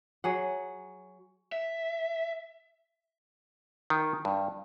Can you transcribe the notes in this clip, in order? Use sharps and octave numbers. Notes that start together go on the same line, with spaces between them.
F#3 G#4 F#5
E5
D#3
G2